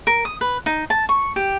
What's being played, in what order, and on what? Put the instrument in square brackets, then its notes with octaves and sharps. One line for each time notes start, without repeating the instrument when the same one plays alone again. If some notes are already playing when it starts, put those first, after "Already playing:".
[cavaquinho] A#4
D#6
B4
D#4
A5
C#6
G4